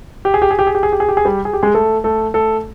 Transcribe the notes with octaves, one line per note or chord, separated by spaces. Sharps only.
G4
G#4
G4
G#4
G4
G#4
G4
G#4
G4
G#4
G4
G#4
G3 G4
G#4
G4
G#3 G#4
A3 A4
A3 A4
A3 A4